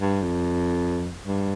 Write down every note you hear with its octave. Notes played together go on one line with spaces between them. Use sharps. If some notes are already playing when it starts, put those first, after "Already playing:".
G2
F2
G2